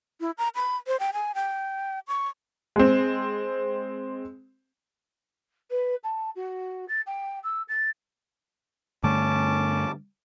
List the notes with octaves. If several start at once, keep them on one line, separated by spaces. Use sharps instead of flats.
E4
A#5
B5
C5
G5
G#5
G5
C#6
G#3 C4
B4
A5
F#4
A6
G5
E6
A6
G2 D3 A3 C#4 A5 D6